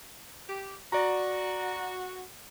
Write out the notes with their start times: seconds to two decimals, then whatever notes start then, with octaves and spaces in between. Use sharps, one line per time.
0.48 G4
0.92 F#4 D5 A#5